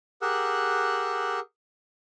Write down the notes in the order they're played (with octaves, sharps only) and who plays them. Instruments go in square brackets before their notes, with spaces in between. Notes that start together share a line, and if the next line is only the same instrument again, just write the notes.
[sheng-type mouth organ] G4 G#4 A#4 F#5 E6 F#6